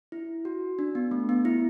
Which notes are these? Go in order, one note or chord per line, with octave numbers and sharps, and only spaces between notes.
E4
F#4
D4
B3
A3
B3
E4